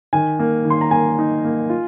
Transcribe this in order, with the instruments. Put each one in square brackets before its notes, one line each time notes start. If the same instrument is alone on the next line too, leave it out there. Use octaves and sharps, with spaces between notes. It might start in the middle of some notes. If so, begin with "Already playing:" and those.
[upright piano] D#3 G#5
A#3
D#3
C6
A#5
A#3 G#5
D#4
A#3
F4